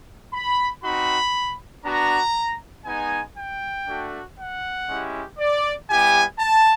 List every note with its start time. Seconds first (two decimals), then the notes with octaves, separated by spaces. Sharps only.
0.34 B5
0.84 C4 D#4 F#4 B5
1.85 B3 D4 F#4 A#5
2.86 G#3 B3 D#4 G#5
3.37 G5
3.88 A3 D4 F#4
4.38 F#5
4.88 G#3 C#4 E4 G4
5.39 D5
5.89 G3 B3 E4 G4 G#5
6.39 A5